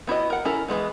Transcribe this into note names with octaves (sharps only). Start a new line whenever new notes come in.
B3 E4 F#4 D#5
A#4 F#5
C#4 E4 A4 A#4
E3 F3 G#3 B3